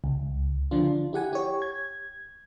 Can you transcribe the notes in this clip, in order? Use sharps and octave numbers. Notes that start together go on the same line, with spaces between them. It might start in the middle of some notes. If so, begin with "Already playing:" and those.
C#2
D3 F3 D4 F4
E4 G4 F#5 G#5
G4 C#5
G#6